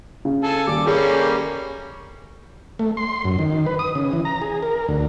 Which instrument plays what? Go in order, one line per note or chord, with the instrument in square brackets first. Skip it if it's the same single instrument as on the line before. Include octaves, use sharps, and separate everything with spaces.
[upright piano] C#3
[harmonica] A4 G#5 A5
[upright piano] D#2 G3 [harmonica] D6
[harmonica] G3 A#3 C#4 [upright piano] G#4 A4 C#5
[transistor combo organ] A3
C6
F#2
D#3
B4
D#6
C#3
E3
A#5
G#4
A#4
D2